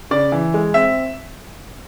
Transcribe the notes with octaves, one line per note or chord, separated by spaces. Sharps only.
C#3 D5
E3
G#3
C4 E5